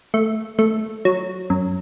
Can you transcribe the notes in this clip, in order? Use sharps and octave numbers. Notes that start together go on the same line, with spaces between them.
A3
A3
F#3
F#2